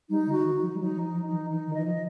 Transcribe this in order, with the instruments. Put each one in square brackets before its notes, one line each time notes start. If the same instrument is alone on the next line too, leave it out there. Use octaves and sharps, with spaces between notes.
[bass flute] G3 [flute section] D#4
[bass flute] D3
[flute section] F#4
[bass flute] D#3
[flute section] D#4
[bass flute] F3
G3
[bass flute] F#3 [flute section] D#4
[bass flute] F3
[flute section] D#4
[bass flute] F3
[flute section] D#4
[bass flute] E3
[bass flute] E3 [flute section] D#4
[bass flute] D#3
[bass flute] E3 [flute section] D#5
[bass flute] F3